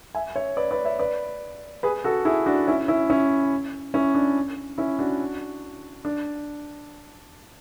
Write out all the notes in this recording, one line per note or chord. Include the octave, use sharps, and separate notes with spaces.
E5 G#5
C#5 E5
B4 D5
B4 D5
C#5 E5
B4 D5
G#4 B4
F#4 A4
E4 G#4
D4 F#4
C#4 E4
C#4 E4
C#4 E4
C#4 E4
D4
C#4 E4
D4 F#4
D4